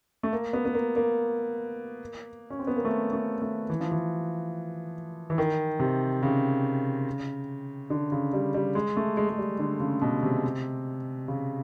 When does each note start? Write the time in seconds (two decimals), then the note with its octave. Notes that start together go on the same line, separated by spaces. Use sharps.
0.23 A3
0.33 A#3
0.53 B3
0.65 B3
0.74 A#3
0.96 A#3
2.50 C#4
2.59 C4
2.67 B3
2.76 A#3
2.85 A3
3.13 A3
3.42 A3
3.70 E3
3.80 F3
3.92 E3
5.30 E3
5.38 D#3
5.80 C3
6.23 C#3
7.90 D3
8.12 C#3
8.33 G3
8.54 G3
8.75 G#3
8.97 A3
9.17 G#3
9.29 G#3
9.38 G3
9.59 D3
9.80 C#3
10.01 B2
10.23 C3
11.28 C#3